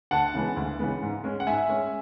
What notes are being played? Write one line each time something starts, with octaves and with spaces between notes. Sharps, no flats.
D2 F#5 A5
C#3 E3 G#3 B3
D2
C#3 E3 G#3 B3
G#2
G#3 C#4
F#5
G#2 E5 G#5
G#3 C#4